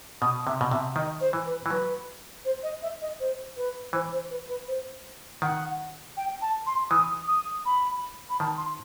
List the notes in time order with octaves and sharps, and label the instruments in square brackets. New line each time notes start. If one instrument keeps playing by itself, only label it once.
[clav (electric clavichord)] B2 [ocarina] D#6
[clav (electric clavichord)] C3 [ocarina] E5
[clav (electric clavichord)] B2
[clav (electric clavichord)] C3 [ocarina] E5
[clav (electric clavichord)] D#3 [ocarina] D#5
[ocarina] C5
[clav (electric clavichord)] E3
[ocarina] B4
[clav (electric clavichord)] E3
[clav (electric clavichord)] F#3 [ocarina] B4
[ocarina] C5
D#5
E5
D#5
C5
B4
[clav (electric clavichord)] E3 [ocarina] C5
[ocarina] C5
B4
B4
C5
[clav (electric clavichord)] D#3 [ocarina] F#5
[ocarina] G5
A5
C6
[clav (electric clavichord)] E3 [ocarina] D#6
[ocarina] D#6
B5
B5
[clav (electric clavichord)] D#3 [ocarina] A5
[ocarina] C6